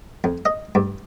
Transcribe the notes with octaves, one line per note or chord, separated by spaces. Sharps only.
F2
D#5
G2